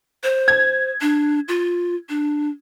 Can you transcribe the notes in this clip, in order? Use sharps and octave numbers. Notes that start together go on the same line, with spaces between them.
C5
G#6
D4
F4
D4